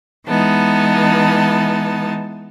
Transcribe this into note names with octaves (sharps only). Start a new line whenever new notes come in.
E3 G#3 B3 D#4 A5